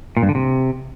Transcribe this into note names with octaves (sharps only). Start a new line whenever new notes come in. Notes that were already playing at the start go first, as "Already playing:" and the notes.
A#2
G2
D3
C3